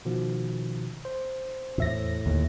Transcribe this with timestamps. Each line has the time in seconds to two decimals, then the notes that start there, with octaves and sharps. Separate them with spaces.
0.05 B2 D#3 F3
1.05 C5
1.78 E2 A2 E5 A#6
2.26 D#2 D3 D#3